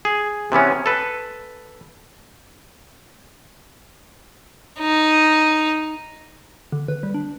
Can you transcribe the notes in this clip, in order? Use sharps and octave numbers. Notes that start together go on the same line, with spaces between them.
G#4
C3 E3 B3 C#4
A4 B4
D#4
D3
B4
G3
D4